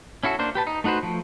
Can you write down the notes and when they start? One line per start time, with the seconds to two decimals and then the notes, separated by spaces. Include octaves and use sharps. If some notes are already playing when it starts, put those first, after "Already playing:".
0.23 C#4 E4 F#4 A4
0.39 A#3 D4 C5
0.55 G4 B4 A5
0.67 D#4
0.84 A3 D#4 F#4 B4 C5
1.03 F3 A3